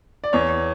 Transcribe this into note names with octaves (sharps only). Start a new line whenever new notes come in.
D5
E2 C#5